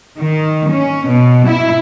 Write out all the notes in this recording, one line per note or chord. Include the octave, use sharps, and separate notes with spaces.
D#3
C#4
B2
E4